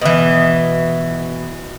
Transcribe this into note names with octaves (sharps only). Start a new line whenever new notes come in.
B2 E3